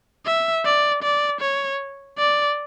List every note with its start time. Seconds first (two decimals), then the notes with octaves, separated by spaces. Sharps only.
0.26 E5
0.65 D5
1.03 D5
1.41 C#5
2.18 D5